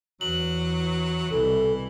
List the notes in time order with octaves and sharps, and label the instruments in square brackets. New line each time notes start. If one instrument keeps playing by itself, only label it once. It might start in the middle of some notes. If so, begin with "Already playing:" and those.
[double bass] E2 E3 [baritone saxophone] F#3 [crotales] F#7
[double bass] C2 B2 [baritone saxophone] E3 [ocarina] A4